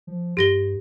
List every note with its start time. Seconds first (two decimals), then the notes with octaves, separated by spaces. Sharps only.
0.07 F3
0.37 G2 G4 A#6 G7